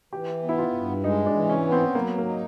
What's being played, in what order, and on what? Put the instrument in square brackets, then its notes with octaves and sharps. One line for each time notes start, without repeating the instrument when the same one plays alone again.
[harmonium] E3 [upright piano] G4
[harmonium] B3
[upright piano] E4
F4
[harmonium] G2
[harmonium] G#3 [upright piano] D#4
[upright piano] D4
[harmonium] E3
[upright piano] C#4
[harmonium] B3
[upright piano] C4
[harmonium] F#3 [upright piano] A#3
[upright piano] A#3
[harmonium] D#4